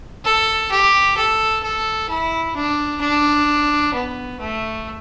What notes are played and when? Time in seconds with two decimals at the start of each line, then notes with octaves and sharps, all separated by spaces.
0.25 A4
0.71 G4
1.17 A4
1.63 A4
2.09 E4
2.56 D4
3.01 D4
3.94 B3
4.40 A3